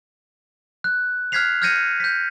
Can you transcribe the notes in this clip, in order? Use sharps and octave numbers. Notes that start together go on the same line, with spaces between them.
F#6
F6 F#6 G#6 B6 C7 F7
F6 G6 G#6 A#6 C#7 D#7
G6 B6